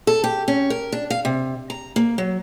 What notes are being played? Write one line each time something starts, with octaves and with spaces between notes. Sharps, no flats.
A4
G4
C#4
A#4
D4
F5
C3
A#5
A#3
F#3